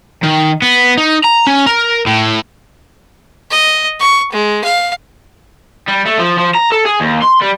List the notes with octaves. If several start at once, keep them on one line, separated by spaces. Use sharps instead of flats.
D#3
B3
D#4
A#5
C#4
A#4
A2
D#5
C#6
G#3
F5
G3
A3
F3
F3
A#5
A4
G#4
D#2
C6
G3